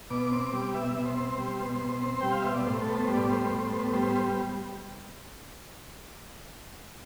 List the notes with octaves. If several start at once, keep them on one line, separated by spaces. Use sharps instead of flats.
B2 D6
C4
G3
B2 E5
B2
C5
C4
G3
B2
B2
C4
G3 G5
F5
B2 E5
D5
A2 C5
A4
B3
C5
G3
D5
A2 C5
A2
B3
G3 C5